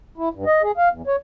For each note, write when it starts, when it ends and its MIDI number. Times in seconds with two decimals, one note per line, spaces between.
0.18 0.29 64
0.34 0.45 43
0.46 0.62 75
0.63 0.72 68
0.77 0.89 77
0.92 1.02 40
1.07 1.16 73